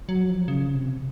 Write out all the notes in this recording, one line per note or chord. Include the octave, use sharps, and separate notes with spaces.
F#3
F3
C#3
C3